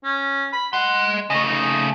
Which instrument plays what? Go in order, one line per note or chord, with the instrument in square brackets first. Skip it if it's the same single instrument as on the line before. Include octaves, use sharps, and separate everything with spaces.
[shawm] C#4
B5
[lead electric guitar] D#5 C6 [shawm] F#5
[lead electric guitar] C#3 A3 [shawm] D#5
[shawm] D#4